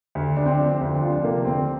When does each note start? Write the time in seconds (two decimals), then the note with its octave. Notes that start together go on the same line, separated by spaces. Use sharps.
0.15 D2
0.37 D2 D4
0.46 C4
0.53 D4
0.59 F3
0.65 C4
0.81 D2
0.95 D4
1.02 F3 F4
1.10 D4
1.24 C3 A#3
1.45 D2 C4